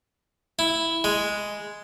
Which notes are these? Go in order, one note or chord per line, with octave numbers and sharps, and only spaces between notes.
E4
G#3